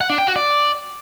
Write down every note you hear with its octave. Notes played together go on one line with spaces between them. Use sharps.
F#5
D4
G5
F#4
D5